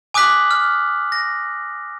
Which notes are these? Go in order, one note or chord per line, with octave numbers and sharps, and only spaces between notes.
G#5 D6 D#6 F#6 B6 F#7
F6
A#6